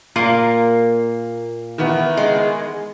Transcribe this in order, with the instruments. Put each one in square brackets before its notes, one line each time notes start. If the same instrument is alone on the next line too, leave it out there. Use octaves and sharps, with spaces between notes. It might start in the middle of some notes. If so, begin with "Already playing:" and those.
[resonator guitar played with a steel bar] A#2 A#3 [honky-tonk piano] C7
[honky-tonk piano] D#3 E3 B3
[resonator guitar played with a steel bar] G#3